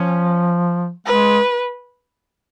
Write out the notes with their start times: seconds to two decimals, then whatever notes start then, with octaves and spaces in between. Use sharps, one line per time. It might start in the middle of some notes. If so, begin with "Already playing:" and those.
Already playing: F3 C#4
1.06 G#3 B4